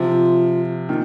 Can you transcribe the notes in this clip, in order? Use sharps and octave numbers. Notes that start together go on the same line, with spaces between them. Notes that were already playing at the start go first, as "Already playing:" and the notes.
Already playing: C3 F3 F4
A#2 D#3